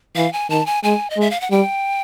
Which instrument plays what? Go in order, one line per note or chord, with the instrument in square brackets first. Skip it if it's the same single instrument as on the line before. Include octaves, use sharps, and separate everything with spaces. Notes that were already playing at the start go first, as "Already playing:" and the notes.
[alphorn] E3 [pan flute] F5
[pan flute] G#5
[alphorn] D#3 [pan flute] A5
[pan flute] G#5
[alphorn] G#3 [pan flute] G#5
[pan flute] D#5
[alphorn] G#3 [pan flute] E5
[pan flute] F5
F#5
[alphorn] G3 [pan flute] G5